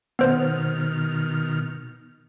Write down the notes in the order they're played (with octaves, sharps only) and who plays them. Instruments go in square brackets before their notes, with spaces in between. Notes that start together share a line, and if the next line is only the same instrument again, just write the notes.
[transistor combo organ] B2 D#3 F6 [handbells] B3 C5